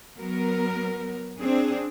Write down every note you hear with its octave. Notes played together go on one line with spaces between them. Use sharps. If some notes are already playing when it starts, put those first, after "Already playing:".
F#3 B3 A#4
C4 D4 G#4